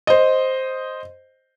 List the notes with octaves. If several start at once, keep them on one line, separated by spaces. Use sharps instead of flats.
C5 D#5